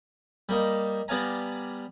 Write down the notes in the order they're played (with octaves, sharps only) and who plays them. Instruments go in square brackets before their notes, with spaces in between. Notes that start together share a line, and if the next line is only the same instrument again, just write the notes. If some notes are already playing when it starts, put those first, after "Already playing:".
[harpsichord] G3 A#3 D#4
G3 B3 D5 F5 G#5 A#5